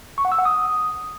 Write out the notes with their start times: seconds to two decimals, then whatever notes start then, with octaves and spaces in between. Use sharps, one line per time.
0.18 C#6
0.25 F#5
0.32 E6
0.39 F#5
0.45 D#6